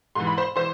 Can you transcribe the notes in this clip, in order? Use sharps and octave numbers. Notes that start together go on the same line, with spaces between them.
G#2 E3 C6
B5
C5 C6
E3 C5 C6